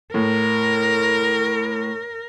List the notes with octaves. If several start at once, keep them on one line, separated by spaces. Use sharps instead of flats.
A2 A#4